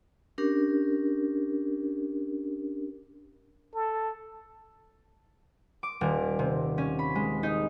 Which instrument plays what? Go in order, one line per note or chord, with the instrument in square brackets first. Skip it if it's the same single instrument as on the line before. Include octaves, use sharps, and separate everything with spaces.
[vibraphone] C#4 D4 G4 A#4
[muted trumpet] A4
[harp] D6
D#1
C3
C#4
B5
G#3
D#4